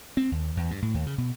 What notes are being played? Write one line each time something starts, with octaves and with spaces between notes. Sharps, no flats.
C4
D#2
E2
G2
A2
D#2
C#3
B2